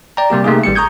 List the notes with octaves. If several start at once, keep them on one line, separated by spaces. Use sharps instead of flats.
D5 G5 A#5
C3 G3 A#3 G4
C3 A3 A#3 D#4 G#4
G#1 G3 G4 C#7
A#5 C#6 D#6 G6 G#6